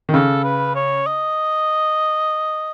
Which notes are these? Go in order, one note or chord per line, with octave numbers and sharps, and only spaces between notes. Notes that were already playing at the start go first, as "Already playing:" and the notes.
D#3
C#3 A4
B4
C#5
D#5